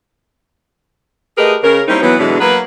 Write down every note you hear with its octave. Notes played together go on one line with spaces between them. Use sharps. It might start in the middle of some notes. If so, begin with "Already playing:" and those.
A3 G4 G#4 A#4 B4 D#5
C#3 A#4
G3 A#3 C4 C#4 D#4 E4
E3 F#3 B3
B2 D3 E3 F#3 G#3 D4
F#3 A#3 B3 B4